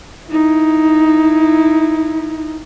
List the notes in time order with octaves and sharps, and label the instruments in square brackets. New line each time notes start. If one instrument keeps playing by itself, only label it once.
[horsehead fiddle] D#4 E4